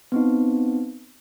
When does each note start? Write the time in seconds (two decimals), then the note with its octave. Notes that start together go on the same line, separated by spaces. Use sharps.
0.12 B3 C4 D#4